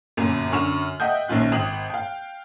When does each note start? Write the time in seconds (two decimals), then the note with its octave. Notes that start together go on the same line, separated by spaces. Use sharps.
0.17 G1 F#2 A#2 F7
0.52 F#2 D3 C#6 F6 E7 F7
1.00 D#5 E5 F#5 G5 D#6 G6
1.28 A#1 D#3 C#4 F4 F#6
1.52 G#1 G5 D#6 F7 F#7
1.90 F5 G5